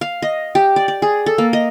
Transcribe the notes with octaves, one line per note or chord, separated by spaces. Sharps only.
F5
D#5
G4
D5
D5
G#4
A4
A#3
D#5